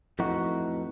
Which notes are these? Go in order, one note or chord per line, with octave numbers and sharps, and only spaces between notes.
F2 A2 E3 D#4 F#4